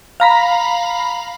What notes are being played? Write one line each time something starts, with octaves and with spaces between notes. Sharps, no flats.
F5 A#5 B5